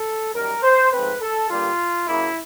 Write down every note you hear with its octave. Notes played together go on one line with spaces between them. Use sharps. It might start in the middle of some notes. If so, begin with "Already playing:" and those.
Already playing: A4
F#2 D#3 G3 A#4
C5
G#2 F3 A3 C4 B4
A4
G2 D3 G3 A#3 F4
C#3 F#3 A#3 E4